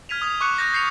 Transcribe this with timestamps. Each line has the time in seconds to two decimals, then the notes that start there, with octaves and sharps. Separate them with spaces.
0.09 F6 G#6 B6 D#7 F7
0.22 D#6 G#6
0.41 C#6 D6 F#6 C#7
0.58 D6 G6 A#6
0.73 G6 C7 C#7 F7